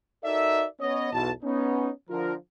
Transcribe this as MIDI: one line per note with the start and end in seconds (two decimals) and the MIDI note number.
0.24 0.65 63
0.24 0.65 66
0.24 0.65 69
0.24 0.65 70
0.24 0.65 74
0.24 0.65 76
0.80 1.10 59
0.80 1.10 61
0.80 1.10 73
0.80 1.10 75
1.13 1.31 35
1.13 1.31 40
1.13 1.31 47
1.13 1.31 81
1.43 1.90 59
1.43 1.90 61
1.43 1.90 63
2.10 2.34 50
2.10 2.34 53
2.10 2.34 65
2.10 2.34 70